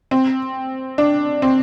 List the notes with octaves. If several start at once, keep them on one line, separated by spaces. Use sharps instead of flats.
C4
D4
C4